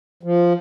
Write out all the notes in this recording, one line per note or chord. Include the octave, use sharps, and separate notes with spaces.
F3